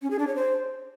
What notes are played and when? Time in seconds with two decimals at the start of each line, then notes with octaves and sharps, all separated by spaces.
0.02 C#4
0.11 G#4
0.19 D4
0.27 C#5
0.36 C5